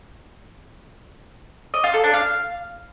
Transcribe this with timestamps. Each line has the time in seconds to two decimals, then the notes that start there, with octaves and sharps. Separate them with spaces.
1.74 D#5
1.84 F4
1.94 A4
2.04 D4
2.14 F5